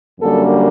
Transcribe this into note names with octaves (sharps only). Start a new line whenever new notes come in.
F#2 D3 G3 A#3 A4